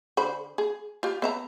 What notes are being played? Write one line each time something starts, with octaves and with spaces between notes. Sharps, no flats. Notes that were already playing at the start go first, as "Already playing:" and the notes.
D3 C5 B5
G#4
F4 G4
B3 E5 A#5